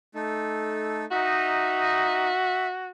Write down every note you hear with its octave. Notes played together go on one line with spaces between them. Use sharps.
A3 D#4 A4
D#4 F#4 E5